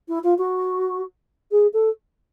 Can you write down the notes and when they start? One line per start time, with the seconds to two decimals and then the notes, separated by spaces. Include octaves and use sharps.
0.08 E4
0.24 F4
0.38 F#4
1.51 G#4
1.73 A4